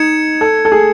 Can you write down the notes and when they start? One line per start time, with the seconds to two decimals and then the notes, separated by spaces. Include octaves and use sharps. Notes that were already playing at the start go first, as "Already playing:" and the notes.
Already playing: D#4 G#6 C#7 E7
0.41 A4
0.65 A4
0.72 G#4